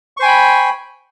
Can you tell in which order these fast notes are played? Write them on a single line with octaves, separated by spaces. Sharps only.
C#6 C5 G#5 G5 B5